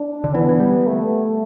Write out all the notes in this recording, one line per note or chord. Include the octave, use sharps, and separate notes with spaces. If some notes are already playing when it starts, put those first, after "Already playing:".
Already playing: D4
D3
E3 B3
E3
G3
A3